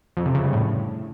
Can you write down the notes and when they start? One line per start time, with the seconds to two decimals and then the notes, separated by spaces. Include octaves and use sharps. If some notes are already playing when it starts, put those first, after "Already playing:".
0.17 F2
0.26 C3
0.35 C#3
0.44 G2
0.53 A2